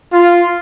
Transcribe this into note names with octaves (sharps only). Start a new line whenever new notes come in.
F4